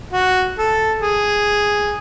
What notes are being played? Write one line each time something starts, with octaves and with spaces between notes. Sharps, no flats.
F#4
A4
G#4